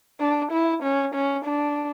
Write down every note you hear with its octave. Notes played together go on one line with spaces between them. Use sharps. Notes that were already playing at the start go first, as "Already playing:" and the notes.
D4
E4
C#4
C#4
D4